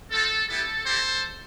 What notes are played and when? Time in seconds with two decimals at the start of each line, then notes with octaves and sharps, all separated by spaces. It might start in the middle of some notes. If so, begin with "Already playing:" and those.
0.11 C4 F4 A4
0.48 G3 B3 E4 G4 A4
0.85 C4 E4 G4 A4 C5